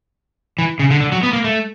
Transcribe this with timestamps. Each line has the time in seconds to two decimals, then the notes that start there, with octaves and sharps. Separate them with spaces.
0.59 E3
0.79 C#3
0.91 D3
1.01 D3
1.12 F#3
1.23 B3
1.33 A#3
1.44 A3